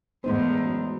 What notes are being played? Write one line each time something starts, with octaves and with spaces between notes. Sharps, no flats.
E2 A2 G#3 B3 D#4 C5
F#2